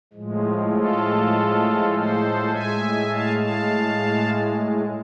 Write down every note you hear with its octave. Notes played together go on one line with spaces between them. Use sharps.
A2 F3 G#3
F4 A4
A4 C5
A2 G#3 E5 G#5
F5 A5
F5 A5